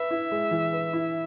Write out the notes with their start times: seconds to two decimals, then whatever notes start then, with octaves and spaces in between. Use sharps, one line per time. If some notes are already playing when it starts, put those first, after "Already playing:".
Already playing: B4 E5
0.11 E4
0.31 G#3
0.51 E3
0.73 B4
0.93 E4